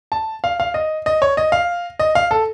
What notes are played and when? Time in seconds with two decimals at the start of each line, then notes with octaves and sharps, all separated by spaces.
0.12 A5
0.44 F5
0.60 F5
0.74 D#5
1.06 D#5
1.22 C#5
1.37 D#5
1.52 F5
1.99 D#5
2.15 F5
2.31 A4